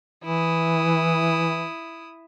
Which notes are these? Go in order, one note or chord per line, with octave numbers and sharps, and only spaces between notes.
E3 E4 D#6